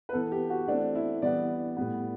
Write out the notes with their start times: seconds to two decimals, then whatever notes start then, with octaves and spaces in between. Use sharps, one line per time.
0.09 B4
0.13 E3 B3 A4
0.32 G4
0.50 F#4
0.68 E3 A3 C4 D4
0.95 E4
1.22 E3 G3 B3 D5
1.77 A2 G3 B3